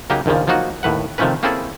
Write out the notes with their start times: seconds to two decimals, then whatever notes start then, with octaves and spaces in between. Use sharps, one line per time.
0.10 C#3 F#3 A#3 D#4 G4
0.26 A#1 D#2 A#2 C#3 F3
0.47 F3 F#3 A#3 D#4 F#4
0.83 D#2 A2 B4 F#5
1.18 C3 D#3 F3 A3 C#4 B4
1.43 A#3 C4 C#4 E4 G#4 A4